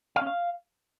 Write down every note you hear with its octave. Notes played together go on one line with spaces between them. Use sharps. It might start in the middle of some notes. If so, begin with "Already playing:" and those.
F5
C#4
F5